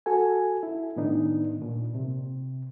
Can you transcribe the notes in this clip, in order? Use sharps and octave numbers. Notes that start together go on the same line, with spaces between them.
F#4 A4 G#5
E4
A2 D#3 B3 D4 D#4
A#2
C3